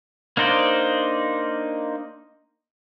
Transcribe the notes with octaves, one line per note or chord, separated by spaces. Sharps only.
A#3 D4 D#4 C5 D5